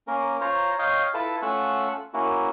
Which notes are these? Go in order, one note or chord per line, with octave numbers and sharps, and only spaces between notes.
A#3 C#4 A#4
F4 C5 C#5 A#5
C#5 D#5 F5 G5
E4 F4 A4 B4 A5
A3 C#4 F4 F#5 C#6 E6
A#3 C#4 E4 F#4